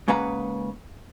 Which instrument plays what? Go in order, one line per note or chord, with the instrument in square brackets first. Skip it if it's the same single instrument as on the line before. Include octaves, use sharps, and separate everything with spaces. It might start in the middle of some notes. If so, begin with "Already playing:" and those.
[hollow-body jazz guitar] G#2 C#3 A#3 B4 F#5 A#5